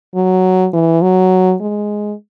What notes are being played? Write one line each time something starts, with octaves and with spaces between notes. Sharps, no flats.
F#3
E3
F#3
G#3